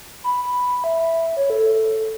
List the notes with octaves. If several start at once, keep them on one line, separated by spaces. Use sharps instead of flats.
B5
E5
C#5
A4